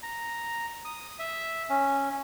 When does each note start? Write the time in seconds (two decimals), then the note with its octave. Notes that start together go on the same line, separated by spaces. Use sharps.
0.03 A#5
0.85 D#6
1.19 E5
1.70 C#4